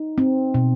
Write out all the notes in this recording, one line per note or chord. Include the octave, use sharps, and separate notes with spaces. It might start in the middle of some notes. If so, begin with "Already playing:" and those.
Already playing: D#4
C4
B2